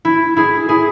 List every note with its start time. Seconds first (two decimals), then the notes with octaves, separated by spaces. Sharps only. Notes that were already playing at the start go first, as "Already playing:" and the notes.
0.05 E4
0.37 E4 G#4
0.69 E4 G#4